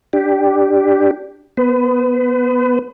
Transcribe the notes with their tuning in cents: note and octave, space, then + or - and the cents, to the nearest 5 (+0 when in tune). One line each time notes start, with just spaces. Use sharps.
D4 +0 G4 +0
B3 -10 B4 +35